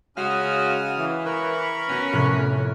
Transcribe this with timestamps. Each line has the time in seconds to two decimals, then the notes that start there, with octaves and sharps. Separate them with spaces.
0.17 C#3 G#3 C#4 F#4 F5 D#6 F6
0.98 E3
1.26 A#4 B4 B5 C#6
1.89 B3 C#4 F#4
2.13 F1 A2 F#6